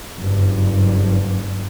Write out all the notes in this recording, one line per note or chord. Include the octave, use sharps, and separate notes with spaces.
F#1 G2